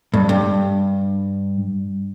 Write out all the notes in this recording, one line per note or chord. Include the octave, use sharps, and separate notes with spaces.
G2
G2